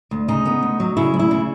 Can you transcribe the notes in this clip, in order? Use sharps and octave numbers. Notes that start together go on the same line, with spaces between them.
D2
C#3 D#4
B3
D2
F#3
C#3 E4
D2
E4
C#3